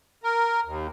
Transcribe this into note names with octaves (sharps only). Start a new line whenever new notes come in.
A#4
D#2